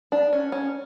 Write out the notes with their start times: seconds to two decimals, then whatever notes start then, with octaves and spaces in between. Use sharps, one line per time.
0.12 D4
0.33 C#4
0.52 C#4